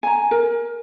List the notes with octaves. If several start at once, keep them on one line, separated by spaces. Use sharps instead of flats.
G#5 A#5
A#4